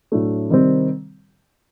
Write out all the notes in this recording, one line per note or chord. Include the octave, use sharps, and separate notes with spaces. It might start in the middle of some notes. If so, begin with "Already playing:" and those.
A2 F#3 A3 D4
C3 D#3 G3 C4